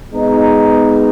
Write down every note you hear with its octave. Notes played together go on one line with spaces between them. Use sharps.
G#3 B3 D#4